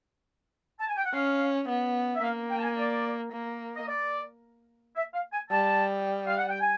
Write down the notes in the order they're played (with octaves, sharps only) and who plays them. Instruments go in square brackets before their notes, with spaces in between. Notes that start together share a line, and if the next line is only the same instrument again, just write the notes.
[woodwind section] A5
G#5
G5
F#5
[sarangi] C#4 [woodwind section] F5
[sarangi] B3
[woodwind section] E5
[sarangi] A#3 [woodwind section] F5
[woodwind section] G5
A5
G#5
D5
[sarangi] A#3
[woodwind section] D#5
D5
E5
F5
G#5
[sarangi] G3 [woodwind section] A5
[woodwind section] F5
F#5
G5
G#5